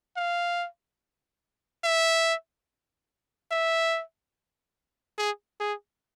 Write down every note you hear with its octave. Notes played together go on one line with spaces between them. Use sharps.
F5
E5
E5
G#4
G#4